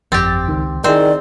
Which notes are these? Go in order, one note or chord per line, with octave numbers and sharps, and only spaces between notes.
G1 F2 C4 G4 A6
C#2 D#3
D#3 C4 D#4 E4 G#4 C5 D5